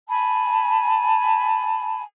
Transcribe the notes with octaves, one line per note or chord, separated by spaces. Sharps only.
G#5 A5 B5